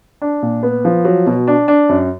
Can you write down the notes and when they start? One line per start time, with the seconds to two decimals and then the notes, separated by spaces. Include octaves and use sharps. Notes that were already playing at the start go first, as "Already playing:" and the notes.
0.22 D4
0.43 A#2
0.63 B3
0.85 F3
1.05 F#3
1.26 B2
1.48 D4
1.68 D4
1.89 F#2